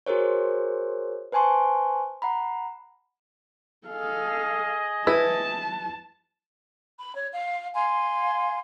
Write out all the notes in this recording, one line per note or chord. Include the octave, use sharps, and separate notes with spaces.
F#4 G#4 A#4 C5 C#5
B4 C5 G#5 A5 C6 C#6
F#5 A#5 B5
G#4 A4 D#5 F5
E4 B4 A5
B5
C#5
F5
F5 G#5 C6